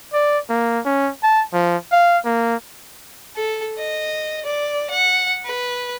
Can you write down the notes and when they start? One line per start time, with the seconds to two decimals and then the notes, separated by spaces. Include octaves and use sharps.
0.13 D5
0.49 A#3
0.85 C#4
1.23 A5
1.53 F3
1.92 F5
2.25 A#3
3.36 A4
3.78 D#5
4.46 D5
4.90 F#5
5.45 B4